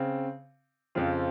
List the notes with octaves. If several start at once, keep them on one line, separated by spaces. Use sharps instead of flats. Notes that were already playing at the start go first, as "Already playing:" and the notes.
Already playing: C#3 C4
F2 C#3 F3 C4 F4